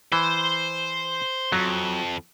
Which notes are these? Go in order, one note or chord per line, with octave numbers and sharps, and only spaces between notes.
E3 C5
F2 F#3